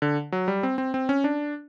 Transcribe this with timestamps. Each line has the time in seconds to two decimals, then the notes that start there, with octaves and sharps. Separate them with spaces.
0.02 D3
0.32 F#3
0.48 G3
0.63 C4
0.78 C4
0.94 C4
1.09 C#4
1.24 D4